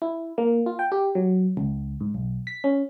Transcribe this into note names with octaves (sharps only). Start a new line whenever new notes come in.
E4
A#3
F4
G5
G4
F#3
C#2
G#2
B1
B6
C#4